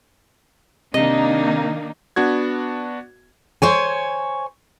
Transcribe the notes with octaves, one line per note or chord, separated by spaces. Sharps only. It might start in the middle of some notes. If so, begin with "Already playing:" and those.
C3 D#3 A#3 D4 D#4 D#5
B3 D4 F#4 G#6
C5 C#5 G#5